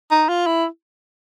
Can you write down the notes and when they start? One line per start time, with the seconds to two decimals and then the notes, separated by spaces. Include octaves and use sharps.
0.11 D#4
0.29 F4
0.47 E4